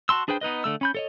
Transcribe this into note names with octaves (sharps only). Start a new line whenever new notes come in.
F#4 A5 C6 E6
D4 G#4 B4 C5 G5
B3 D#4 B4 D#5
D3 A3 E6
C#4 B5 G6
A4 C#5 D#5